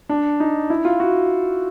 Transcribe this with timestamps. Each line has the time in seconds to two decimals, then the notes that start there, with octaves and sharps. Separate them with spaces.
0.09 D4
0.40 D#4
0.70 E4
0.85 F4
1.00 F#4